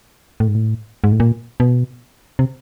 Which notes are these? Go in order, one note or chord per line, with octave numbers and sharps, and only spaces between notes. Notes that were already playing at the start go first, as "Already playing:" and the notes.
A2
G#2
A2
G#2
A2
A#2
B2
C3